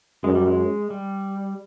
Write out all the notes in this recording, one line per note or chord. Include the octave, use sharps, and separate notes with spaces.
F#2 G#3
G3
G#3
G3